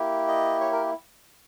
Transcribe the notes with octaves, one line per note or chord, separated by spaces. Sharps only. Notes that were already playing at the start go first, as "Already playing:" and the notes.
Already playing: A#3 E4 G4
D#5
C#5
A#4